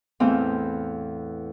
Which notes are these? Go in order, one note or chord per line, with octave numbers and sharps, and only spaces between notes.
E2 A2 C4 G#4 F5